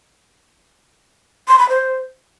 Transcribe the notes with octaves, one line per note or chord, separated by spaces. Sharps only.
C6
B5
C5